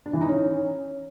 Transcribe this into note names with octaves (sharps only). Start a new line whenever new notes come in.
D4
E3
D#4
C#4